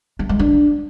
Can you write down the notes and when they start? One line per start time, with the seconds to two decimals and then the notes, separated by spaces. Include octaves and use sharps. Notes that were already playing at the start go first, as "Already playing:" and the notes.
0.19 A3
0.29 G#3
0.39 D4